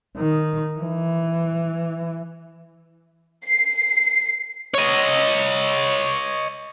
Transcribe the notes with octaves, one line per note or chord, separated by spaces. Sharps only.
D#3
E3
C7
C#5 D#5